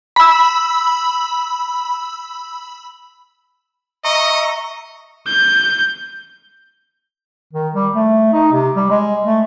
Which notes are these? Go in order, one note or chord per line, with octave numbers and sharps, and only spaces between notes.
B5 E6
D#5 E5 A#5 C#6
G6
D#3
G3
A3
D#4
C3
G3
G#3
A3